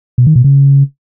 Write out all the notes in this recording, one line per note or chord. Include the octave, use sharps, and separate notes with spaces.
B2
D#3
B2
C#3